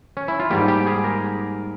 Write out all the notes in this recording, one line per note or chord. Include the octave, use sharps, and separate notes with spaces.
C#4
E4
F4
G#2 G3 A#3 G4
G4
G#4
A#4